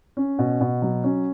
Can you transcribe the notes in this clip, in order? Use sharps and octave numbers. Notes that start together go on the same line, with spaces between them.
C#4
B2
B2
F#3
C#4